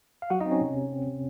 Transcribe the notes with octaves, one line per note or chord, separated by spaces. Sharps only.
F5
F#3 F#4 F#5
D#4 D#5
C4
C#4 C#5
C3
C3
C4
C3